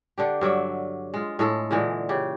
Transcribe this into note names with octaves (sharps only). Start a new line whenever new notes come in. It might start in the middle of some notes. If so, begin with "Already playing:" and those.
D3 D4 G4
G2 F#3 D5 E5
G#3 F4
A2 G#3 A4
A#2 D3 E3 G#3
C#3 G4